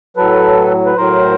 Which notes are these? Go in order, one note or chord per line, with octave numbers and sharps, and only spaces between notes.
A2 F#3 A4 B4
B4
A2 F#3 A#4 C5